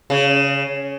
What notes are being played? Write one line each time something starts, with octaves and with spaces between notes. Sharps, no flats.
C#3